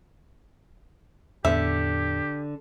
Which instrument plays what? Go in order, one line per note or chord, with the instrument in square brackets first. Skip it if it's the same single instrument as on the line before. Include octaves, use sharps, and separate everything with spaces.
[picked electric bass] E2 A2 B3 [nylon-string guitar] D3 [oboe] G4 [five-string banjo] E5